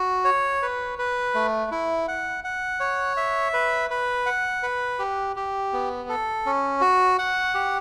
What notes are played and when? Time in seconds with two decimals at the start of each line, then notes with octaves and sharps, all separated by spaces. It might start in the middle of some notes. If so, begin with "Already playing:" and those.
Already playing: F#4
0.25 C#5
0.62 B4
0.99 B4
1.34 A3
1.71 E4
2.08 F#5
2.44 F#5
2.80 C#5
3.17 E5
3.53 B4
3.91 B4
4.26 F#5
4.63 B4
4.99 G4
5.36 G4
5.73 B3
6.09 A4
6.46 C#4
6.81 F#4
7.19 F#5
7.54 G4